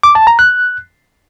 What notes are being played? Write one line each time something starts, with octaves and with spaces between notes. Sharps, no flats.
D6
A5
A#5
F#6